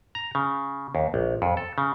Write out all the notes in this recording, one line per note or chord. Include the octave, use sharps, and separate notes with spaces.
A#5
C#3
D#2
A#1
F2
A4
C#3